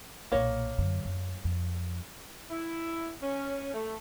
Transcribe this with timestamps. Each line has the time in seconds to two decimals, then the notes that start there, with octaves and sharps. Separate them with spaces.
0.32 B1 A#2 A#3 C#5
0.78 F#2 D3
1.05 F#2
1.44 F2
2.50 E4
3.21 C#4
3.73 A3